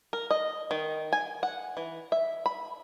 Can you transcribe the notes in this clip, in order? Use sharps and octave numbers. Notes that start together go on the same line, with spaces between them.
A#4
D#5
D#3
G#5
F#5
E3
E5
B5